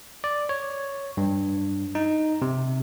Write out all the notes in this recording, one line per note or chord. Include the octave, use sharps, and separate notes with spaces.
D5
C#5
G2
D#4
C3